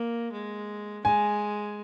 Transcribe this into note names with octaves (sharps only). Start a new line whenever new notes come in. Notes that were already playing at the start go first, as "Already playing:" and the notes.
Already playing: A#3
G#3
G#3 G#5